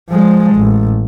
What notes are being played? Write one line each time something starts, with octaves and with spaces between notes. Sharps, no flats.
F3 G#3
A1